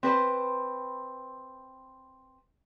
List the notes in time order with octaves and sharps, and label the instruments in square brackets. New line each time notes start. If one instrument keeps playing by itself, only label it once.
[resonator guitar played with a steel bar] C4 B4 C5